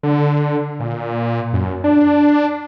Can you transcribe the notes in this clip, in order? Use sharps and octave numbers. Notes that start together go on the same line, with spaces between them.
D3
A#2
F#2
D4